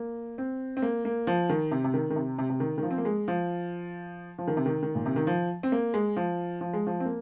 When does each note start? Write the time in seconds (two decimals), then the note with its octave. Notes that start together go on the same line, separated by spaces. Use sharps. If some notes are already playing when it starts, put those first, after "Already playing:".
Already playing: A#3
0.38 C4
0.77 C4
0.82 A#3
1.05 A#3
1.27 F3
1.49 D#3
1.71 C3
1.84 C3
1.94 D#3
2.10 D#3
2.16 C3
2.38 C3
2.50 C3
2.60 D#3
2.78 D#3
2.83 F3
2.91 C4
2.98 A#3
3.05 G#3
3.28 F3
4.38 F3
4.47 D#3
4.57 C3
4.66 D#3
4.83 D#3
4.95 A#2
5.06 C3
5.16 D#3
5.27 F3
5.63 C4
5.72 A#3
5.94 G#3
6.16 F3
6.61 F3
6.73 G#3
6.87 F3
7.00 C4
7.05 A#3